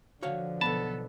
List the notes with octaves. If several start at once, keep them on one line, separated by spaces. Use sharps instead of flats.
D3 F3 F#4 C#5 F5
B1 G2 B3 A4 A5 B5